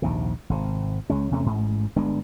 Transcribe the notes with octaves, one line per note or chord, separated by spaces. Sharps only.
A#1 D#2 C3
G#1 C3
C#2 G#3 C#4
E2 C3 A3 C#4
A1 G#2
G1 G#3 B3 D4